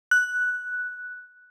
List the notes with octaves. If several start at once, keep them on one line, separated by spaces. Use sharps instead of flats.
F#6